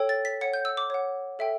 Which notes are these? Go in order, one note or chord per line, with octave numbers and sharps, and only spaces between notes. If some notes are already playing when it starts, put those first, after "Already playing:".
Already playing: A4 C#5 G5
A6
B6
C#5 F#5 C#7
G6
E6
D6
C#5 F#5
A4 E5 G5